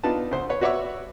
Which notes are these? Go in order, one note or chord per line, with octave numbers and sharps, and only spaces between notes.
B3 D4 D#4 F4 B4 A5
D2 C5
B4 C#5
F#4 B4 C#5 D5 E5 C#6